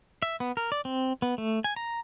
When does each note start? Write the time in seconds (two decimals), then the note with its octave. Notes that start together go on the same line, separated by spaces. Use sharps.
0.22 E5
0.40 B3
0.57 A#4
0.72 D5
0.85 C4
1.22 B3
1.38 A3
1.64 G#5
1.76 A#5